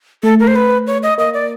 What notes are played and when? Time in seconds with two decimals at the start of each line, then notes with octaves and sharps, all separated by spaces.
0.23 A3 A4
0.40 A#4
0.47 C5
0.56 B4
0.87 C#5
1.03 D#5
1.18 A#3 D#5
1.34 D5